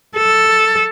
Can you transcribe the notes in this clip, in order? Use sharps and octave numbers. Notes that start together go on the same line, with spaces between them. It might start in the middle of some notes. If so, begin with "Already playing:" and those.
A4